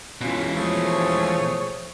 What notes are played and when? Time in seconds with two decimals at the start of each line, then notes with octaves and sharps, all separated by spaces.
0.21 B2 E3 G#3 C#4 F4
0.56 F3 A3 G#4 C#5